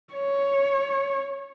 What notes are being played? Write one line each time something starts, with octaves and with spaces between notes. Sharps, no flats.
C#5